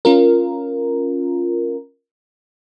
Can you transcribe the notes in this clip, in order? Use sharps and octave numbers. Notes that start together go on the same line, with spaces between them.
C#4 F4 A#4